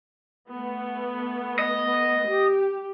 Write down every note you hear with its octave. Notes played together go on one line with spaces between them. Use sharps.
A3 B3
D#5
G4